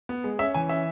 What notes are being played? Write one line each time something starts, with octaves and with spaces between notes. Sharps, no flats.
B3
G#3
C#4 E5
E3 G#5
C#4 E5